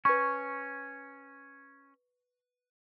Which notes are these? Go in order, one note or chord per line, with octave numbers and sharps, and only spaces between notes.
C#4 B4 C#6